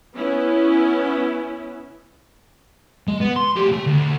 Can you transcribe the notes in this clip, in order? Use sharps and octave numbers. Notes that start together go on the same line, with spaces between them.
B3 C#4 E4
G#3
B3
C6
A2 G4
A3
D2